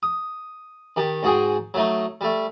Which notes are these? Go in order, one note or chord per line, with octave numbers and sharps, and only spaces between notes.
D#6
D#3 G4 A5
G#2 F#4 G#4 G5
F#3 A3 D#4
G3 A3